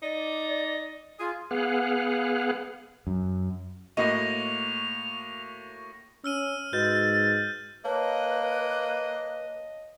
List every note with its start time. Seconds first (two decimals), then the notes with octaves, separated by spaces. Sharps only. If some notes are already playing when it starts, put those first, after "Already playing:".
0.02 D#4 D5
1.19 F4 G#4
1.51 B3 G#4 F5 F#5
3.07 F#2
3.97 A2 A#3 F#4 D#5 C#6 A#6 F7
6.24 C#4 E6 F6 D#7
6.73 G#2 F#4 B4 D#5 G6 A6
7.85 A#3 B4 C#5 D#5 F5 A5